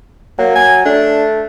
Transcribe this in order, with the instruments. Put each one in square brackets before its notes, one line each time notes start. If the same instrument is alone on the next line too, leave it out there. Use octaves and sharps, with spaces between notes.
[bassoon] F#3 [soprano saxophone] A#3
[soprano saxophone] G#5
[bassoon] A3 [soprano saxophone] D4